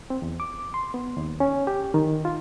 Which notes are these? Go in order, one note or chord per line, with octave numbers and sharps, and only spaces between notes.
C4
E2
D6
C6
B3
D#2
C#4
G4
D#3
F4